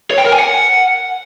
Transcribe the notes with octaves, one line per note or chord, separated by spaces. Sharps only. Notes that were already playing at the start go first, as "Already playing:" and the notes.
C#5
G5
A#4
G#5
F#5